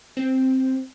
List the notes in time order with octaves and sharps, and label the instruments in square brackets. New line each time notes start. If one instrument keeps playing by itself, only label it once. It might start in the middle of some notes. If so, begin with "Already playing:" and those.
[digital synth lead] C4